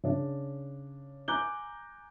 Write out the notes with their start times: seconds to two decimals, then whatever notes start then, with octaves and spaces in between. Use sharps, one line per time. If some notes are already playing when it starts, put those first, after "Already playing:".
0.04 C#3 D4
1.28 G#5 A#5 D6 F#6 G6 G7